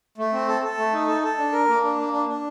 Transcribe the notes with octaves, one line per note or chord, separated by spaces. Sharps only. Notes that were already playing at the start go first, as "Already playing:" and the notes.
A3
C4
A4
A4
A3
D#4
A4
A4
D4
A#4
A#3
D4
A#3
D4
D4